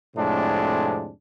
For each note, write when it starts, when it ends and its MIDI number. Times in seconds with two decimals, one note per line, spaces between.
0.16 1.10 41
0.16 1.10 45
0.16 1.10 48
0.16 1.10 56
0.16 1.10 62